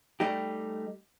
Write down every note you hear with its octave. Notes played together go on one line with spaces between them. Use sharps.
G3 A3 D#4 G4